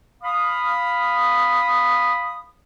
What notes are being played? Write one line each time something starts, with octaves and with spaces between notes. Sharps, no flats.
F5 B5 D#6